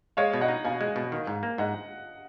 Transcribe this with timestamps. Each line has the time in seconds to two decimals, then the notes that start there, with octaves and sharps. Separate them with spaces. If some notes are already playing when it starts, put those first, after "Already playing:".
0.17 G#3 C#5 F5
0.34 B2
0.41 D#5 F#5
0.48 D#4
0.65 B2 F5 G#5
0.81 G#3
0.96 B2
1.12 D#3
1.27 G#2
1.43 A#3
1.58 G#2 D#5 F#5